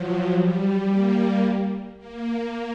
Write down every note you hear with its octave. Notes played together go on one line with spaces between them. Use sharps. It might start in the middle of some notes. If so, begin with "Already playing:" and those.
Already playing: F3 F#3
G3
A#3
A#3